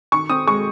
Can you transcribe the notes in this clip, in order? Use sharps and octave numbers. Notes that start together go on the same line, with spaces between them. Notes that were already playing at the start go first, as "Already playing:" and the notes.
D#3 C#6
C4 D#6
G#3 C#6